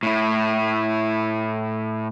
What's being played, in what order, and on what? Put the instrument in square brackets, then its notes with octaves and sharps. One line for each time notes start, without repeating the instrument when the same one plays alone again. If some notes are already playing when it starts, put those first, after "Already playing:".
[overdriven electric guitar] A2 E4